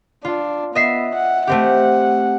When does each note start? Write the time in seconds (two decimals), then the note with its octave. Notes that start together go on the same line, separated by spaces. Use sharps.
0.25 D4 F4
0.75 B3 D#5 E5 C7
1.16 F#5
1.47 A3 C4 G4 F#5